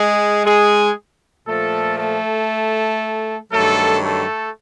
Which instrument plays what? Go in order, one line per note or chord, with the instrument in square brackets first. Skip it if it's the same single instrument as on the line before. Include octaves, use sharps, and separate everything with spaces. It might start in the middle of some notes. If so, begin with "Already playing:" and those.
Already playing: [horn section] G#3 G#4
G#3 G#4
A#2 F3 A3 A4
A3 A4
G2 D#3 F#3 A3 A4
A3 A4